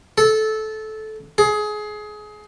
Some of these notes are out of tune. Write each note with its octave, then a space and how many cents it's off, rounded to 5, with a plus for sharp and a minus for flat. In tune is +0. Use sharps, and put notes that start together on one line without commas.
A4 -15
G#4 +20